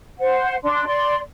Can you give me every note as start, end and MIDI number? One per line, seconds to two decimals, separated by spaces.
0.20 0.55 72
0.20 0.55 78
0.63 0.84 62
0.63 0.84 84
0.86 1.17 74
0.86 1.17 84